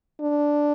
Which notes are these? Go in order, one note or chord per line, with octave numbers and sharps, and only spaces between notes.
D4